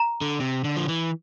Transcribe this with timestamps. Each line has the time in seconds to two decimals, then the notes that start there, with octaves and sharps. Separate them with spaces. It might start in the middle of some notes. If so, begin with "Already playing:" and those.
Already playing: A#5
0.21 D3
0.40 C3
0.64 D3
0.76 F3
0.88 E3